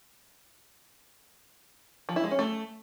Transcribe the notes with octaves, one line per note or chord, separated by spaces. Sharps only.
F3
E4
G#3
C#4
A3